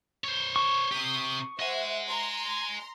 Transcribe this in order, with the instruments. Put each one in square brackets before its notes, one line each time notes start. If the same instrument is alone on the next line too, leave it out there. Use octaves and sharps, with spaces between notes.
[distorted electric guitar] C5 C#5
[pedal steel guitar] C#6
[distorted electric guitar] C3 G4 [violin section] D#6 C7
[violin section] C5 E5 F#5 [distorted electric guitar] D#5 G#5
[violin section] A#5 C6